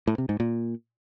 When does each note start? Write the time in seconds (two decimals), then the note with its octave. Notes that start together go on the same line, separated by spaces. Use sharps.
0.08 A2
0.18 C3
0.29 G#2
0.40 A#2